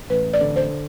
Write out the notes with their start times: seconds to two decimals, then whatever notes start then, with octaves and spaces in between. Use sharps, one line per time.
0.10 A1 B4
0.34 D5
0.41 D3
0.56 C5